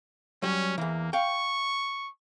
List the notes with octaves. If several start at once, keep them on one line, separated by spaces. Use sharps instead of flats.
F#3 G3 C#4
E2 E3 A#3
F5 G5 C#6